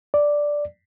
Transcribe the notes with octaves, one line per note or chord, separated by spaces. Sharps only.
D5